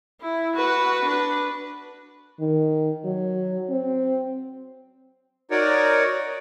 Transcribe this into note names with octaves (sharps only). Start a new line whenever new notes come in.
E4
F#4 B4
D4 B4
D#3
F#3
C4
D#4 F#4 A#4 C#5 D5